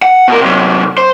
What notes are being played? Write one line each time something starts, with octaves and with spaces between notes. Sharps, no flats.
F#5
B2 A#4
C3 F#3
C5